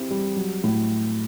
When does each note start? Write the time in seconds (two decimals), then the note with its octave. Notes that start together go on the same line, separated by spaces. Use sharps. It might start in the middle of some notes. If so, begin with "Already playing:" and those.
Already playing: C4 E4 G4
0.11 G3
0.36 F#3
0.64 A2